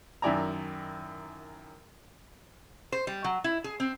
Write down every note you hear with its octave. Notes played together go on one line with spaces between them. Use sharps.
F#2 D#3 E4 D5 G#5 A#5
C5
G3
F#3
E4
G#4
C4